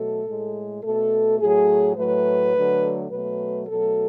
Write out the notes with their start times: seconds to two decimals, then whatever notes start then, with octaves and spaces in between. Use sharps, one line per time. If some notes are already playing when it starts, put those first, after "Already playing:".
Already playing: B2 F#3 A3 A4
0.26 A2 G#3
0.83 B2 A3 A4
1.39 A2 F#3 A3 G#4
1.96 A2 F#3 A3 B4
2.53 D3 F#3 A3
3.10 B2 F#3 A3 B4
3.67 B2 F#3 A3 A4